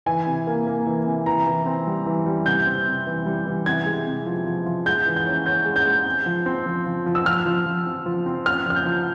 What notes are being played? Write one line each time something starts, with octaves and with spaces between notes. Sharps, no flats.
E3 G#5
C3
A#3
A#3
E3
C3
E3 A#5
E3
C4
G3
E3
G3
C3 G6
C4
C3
E3
G3
E3
C3 G#6
G#3
C3
F3
F3
F3
G#3 G6
E3
G6
C#4
C#4 G6
G#3
G6
G#3
C4
F3
C4
F3
F3
F3
E6
F3 F6
F3
F3
C4
F3
C4
C#4 F6
F3 F6
G6
F3